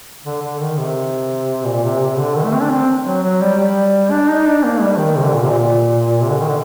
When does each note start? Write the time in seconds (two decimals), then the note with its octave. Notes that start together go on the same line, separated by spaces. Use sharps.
0.25 D3
0.42 D3
0.60 D#3
0.77 C3
1.65 A#2
1.83 C3
2.00 C3
2.18 D3
2.35 D#3
2.44 A3
2.53 C4
2.62 D4
2.70 C4
3.05 F#3
3.23 F#3
3.41 G3
3.58 G3
4.11 D4
4.28 D#4
4.46 D4
4.64 A#3
4.81 G3
4.98 D#3
5.16 C3
5.25 D3
5.34 A#2
5.43 C3
5.51 A#2
6.21 C3
6.30 D3
6.39 D#3
6.48 D3